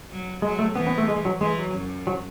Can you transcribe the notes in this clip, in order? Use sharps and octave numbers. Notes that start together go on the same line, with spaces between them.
F#3
F#3 G#3
A3
E3 B3
B3
A3
G#3
F#3
E3 G#3
F#3
F#2
F#3